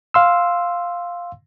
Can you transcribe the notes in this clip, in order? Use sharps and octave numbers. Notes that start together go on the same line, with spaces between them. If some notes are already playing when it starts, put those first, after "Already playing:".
F5 C6 E6